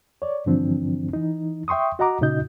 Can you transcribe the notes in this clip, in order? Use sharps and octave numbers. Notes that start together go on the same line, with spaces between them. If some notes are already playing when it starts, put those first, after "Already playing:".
C#5 D5
G2 D3 E3 F3 C4 D4
E3 D#4
E5 G5 C6 C#6 D#6
F#4 D#5 F#5 A#5 D6
A#2 C#3 D#4 F#4 D#5 G6